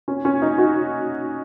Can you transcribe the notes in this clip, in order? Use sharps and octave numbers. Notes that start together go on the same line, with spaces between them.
C#4
C#4
D#4
F#4